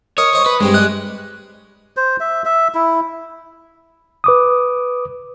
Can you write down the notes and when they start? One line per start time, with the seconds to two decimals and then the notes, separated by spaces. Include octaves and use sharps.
0.18 A#4 C#5 D#5 D#6
0.33 C5 D#5 C#6
0.46 B4
0.60 G2 G#3 C4 G4
0.74 G3 D5 D#5 F#6
1.97 C5
2.20 E5
2.45 E5
2.74 E4
4.24 B4 D6 D#6